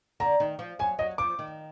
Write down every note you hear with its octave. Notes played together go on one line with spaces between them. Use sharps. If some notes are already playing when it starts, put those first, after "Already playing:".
D3 A#5
D#3
F3
F#3 G#5
F#3 D#5
F3 D6
D#3